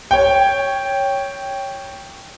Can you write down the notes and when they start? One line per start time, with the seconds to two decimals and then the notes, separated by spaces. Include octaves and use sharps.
0.11 C#5 G5